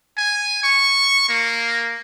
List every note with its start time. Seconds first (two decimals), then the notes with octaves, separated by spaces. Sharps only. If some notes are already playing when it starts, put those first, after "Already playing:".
0.17 G#5
0.63 C#6
1.29 A#3